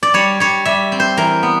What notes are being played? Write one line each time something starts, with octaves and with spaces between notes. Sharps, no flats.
D5
G3 C#5
G3 C#5
G3 E5
C4
C5
E3 A#4
B3